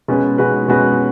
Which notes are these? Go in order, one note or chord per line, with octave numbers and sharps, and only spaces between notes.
B2 G#3 C#4 F#4 B4
B2 G#3 C#4 F#4 B4
B2 G#3 C#4 F#4 B4